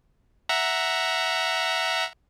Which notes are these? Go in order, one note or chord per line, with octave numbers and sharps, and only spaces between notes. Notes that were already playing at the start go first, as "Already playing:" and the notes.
E5 F#5 A#5